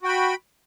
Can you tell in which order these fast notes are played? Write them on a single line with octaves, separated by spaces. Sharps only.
F#4 G5 B5